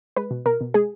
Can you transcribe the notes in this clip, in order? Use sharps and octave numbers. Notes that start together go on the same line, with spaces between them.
G#3 B4
B2
B2 A#4
B2
G#3 G#4